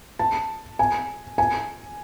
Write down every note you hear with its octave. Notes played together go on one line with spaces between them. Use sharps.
A5
G#5
G#5